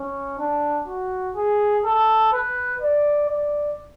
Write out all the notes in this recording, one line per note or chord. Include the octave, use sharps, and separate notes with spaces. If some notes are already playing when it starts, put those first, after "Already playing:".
Already playing: C#4
D4
F#4
G#4
A4
B4
D5
D5